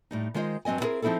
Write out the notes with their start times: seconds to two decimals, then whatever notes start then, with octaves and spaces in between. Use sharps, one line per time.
0.11 A2 G3 D#4
0.34 D#3 G#3 F4 C5 D#5
0.65 G2 F#3 C4 D#5 G#5
0.80 B3 C4 E4 G4 G#4 A#4
1.02 F3 C4 D#4 E4 G#4 A4